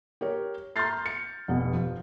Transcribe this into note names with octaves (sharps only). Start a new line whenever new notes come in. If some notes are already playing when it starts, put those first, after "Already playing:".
G4 A#4 C#5
A#5 C6 F6 G6 A6 C7
C#7
F1 B2
F3